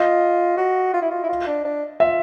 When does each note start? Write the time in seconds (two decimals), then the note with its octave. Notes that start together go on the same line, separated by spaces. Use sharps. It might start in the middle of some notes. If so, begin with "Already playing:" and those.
Already playing: F4 D#5
0.57 F#4
0.94 F4
1.02 E4
1.11 F4
1.24 E4
1.29 F4
1.47 D4
1.65 D4
2.00 F4 E5